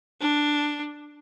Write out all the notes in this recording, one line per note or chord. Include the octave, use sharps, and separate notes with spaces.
D4